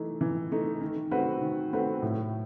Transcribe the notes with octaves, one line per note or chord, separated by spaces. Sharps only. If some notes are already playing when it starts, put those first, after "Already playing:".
Already playing: E3 A3 D#4
E3
A3 D#4
D#3
A3 C4 F#4 B4
D#3
A3 C4 F#4 B4
A2